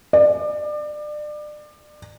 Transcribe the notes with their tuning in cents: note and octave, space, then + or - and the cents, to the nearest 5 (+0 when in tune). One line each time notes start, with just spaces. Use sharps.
D5 +30